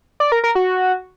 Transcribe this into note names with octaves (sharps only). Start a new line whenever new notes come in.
D5
A#4
A#4
F#4